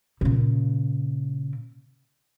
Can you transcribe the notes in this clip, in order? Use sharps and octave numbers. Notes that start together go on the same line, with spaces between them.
A#2 C#3